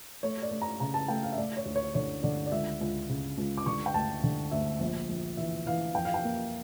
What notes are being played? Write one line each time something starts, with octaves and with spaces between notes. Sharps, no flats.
A3 C#5
D5
A3
A#5
C#3 A#5
A5
A3 G5
F5
E5
A3 D5
C#5
D2
C#5
D3 C#5
D3 D5
D5
C#2 E5
C#2
C#3
C#2
D6
D3 C#6
G5
D2 A5
D3
D2 E5
A#1
A#1
E3 E5
E3 F5
F2 G5
F5
G5
A#3